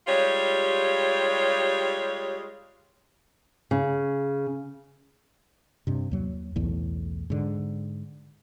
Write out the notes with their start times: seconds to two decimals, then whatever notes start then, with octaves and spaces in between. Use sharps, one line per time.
0.07 G3 G#3 F4 G4 C#5
3.71 C#3
5.87 G2 C3
6.11 D#2 F#3
6.56 B1 E2 A2
7.30 G#2 D3